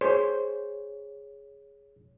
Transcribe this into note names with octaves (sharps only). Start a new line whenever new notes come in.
G#4 C5 C#5